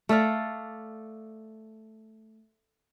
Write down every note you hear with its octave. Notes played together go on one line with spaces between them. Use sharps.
A3 A4 D5 F5